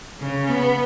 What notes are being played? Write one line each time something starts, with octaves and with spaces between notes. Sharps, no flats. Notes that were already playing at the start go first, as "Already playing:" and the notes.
C#3
B3